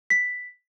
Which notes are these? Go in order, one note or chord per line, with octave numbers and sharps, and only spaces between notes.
B6